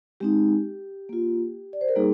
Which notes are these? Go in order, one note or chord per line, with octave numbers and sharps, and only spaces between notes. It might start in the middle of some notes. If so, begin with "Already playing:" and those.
G#3 C4 D#4 G4
A#3 F4
D5
C5
A#4
G3 A#3 D#4 G#4